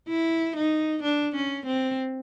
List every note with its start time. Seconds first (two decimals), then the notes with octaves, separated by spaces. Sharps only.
0.09 E4
0.56 D#4
1.03 D4
1.36 C#4
1.67 C4